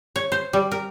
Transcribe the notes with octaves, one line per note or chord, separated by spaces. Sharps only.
C#5
C5
G3
A#4